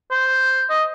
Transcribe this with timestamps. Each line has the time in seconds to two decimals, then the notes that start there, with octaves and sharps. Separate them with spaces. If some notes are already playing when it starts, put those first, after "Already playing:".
0.11 C5
0.70 D#5